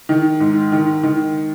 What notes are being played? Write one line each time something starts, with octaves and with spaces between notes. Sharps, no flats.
D#3
G#2
D#3
D#3